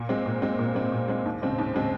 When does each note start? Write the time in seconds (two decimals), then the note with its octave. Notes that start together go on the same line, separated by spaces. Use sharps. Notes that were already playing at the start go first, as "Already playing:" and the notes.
Already playing: A#2
0.09 G#3 C4
0.26 A#2
0.42 G#3 C4
0.59 A#2
0.75 G#3 C4
0.92 A#2
1.08 G#3 C4
1.25 D#2
1.42 C#3 G#3 C4
1.58 D#2
1.74 C#3 G#3 C4